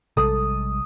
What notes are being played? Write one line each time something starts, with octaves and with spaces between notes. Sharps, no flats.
A#1 C3 G3 G#3 A4 D#6